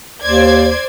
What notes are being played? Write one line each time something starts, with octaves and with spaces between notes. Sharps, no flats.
D#2 C5 D5 G#6